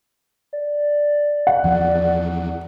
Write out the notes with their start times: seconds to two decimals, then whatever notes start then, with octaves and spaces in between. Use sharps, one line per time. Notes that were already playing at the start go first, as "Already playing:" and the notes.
0.53 D5
1.47 F#5
1.64 E2 E3 F3